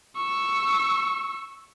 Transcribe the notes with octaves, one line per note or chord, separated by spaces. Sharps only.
C#6 E6